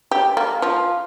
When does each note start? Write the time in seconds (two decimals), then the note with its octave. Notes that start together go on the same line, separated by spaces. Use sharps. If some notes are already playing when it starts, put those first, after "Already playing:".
0.11 G4
0.37 A#3
0.62 F3